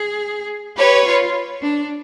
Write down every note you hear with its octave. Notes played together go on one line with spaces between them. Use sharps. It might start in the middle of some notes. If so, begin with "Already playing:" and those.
Already playing: G#4
G4 B4 C#5
F4
D4